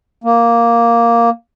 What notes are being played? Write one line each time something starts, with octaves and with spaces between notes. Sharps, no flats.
A#3